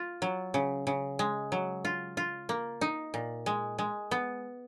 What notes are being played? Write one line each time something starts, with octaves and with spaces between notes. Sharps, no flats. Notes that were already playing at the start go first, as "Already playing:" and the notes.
Already playing: F4
F#3
C#3
C#3
G#3
F#3
F4
F4
A#3
D#4
A#2
G#3
G#3
B3